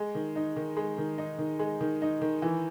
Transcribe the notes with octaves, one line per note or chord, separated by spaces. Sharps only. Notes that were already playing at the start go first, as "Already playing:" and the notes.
Already playing: G#3
D#3
D#4
D#3
G#3
D#3
D#4
D#3
G#3
D#3
D#4
D#3
E3